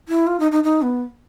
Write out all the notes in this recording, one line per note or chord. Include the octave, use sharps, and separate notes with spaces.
E4
F4
D#4
D#4
D#4
B3